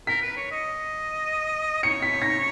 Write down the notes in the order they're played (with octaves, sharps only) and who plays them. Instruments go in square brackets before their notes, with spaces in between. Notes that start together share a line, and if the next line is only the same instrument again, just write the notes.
[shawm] A#4 [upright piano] B6
[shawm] B4
C#5
D#5
[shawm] C#5 [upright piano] C#7
[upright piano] B6
A#6